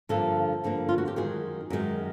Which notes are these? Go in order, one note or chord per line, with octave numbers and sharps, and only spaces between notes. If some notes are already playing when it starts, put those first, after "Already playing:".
G2 D3 F3 A#3 A4
G2 D3 F3 A#3
F4
F#4
G4
F#2 D#3 G#3 G#4
F#2 D#3 G#3